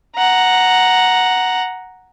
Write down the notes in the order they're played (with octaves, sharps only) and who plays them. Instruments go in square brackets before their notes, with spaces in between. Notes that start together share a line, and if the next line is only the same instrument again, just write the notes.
[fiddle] F#5 A#5